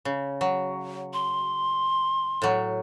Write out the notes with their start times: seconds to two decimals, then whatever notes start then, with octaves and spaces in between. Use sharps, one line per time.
0.05 C#3
0.41 F#3
1.13 C6
2.42 A2 F#3